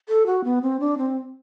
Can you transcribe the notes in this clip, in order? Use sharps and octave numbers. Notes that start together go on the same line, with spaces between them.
A4
F#4
B3
C4
D4
C4